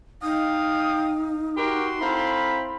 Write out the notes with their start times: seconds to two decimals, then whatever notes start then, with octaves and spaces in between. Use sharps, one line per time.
0.23 D#4 F5 G5 D#6
1.57 F#4 G4 A#4 C6
2.00 C4 E4 A4 F5 A#5 B5